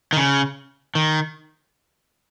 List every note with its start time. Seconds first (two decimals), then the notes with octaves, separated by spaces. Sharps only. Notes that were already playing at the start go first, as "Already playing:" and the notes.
0.13 D#3
0.17 C#3
0.95 D#3